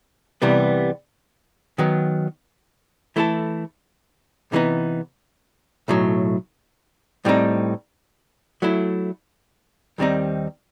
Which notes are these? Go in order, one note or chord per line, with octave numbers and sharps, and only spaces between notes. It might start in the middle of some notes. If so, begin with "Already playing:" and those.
C2 C3 E3 G3 B3
D#3 F#3 B3
E3 A3 E4 A4
C3 E3 G3 B3 D#4
B1 A2 F#3
A2 G3 C4 D#4
F#3 A3 E4
D#2 D#3 G3 C4 D#4